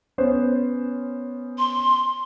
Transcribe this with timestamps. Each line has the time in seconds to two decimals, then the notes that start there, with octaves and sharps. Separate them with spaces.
0.18 B3 C#4 C5
1.58 C6